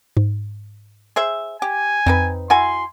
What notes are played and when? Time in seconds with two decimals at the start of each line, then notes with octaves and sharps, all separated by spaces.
0.17 G#2
1.16 G#4 C5 E5
1.62 G4 G#5
2.06 F2 C4 D#4 B4
2.50 E4 F#4 G#5 C6